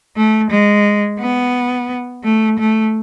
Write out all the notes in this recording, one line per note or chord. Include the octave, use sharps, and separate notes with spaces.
A3
G#3
B3
A3
A3